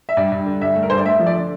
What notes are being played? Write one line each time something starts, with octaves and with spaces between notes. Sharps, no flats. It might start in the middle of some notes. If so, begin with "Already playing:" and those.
E5
G2 D5
G2
D3
G2 E5
A3
A#4
G2 C5
D5
A3 E5
F3
D5
D3